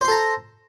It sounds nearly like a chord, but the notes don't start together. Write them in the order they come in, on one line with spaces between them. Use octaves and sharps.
C5 C6 A4 A#5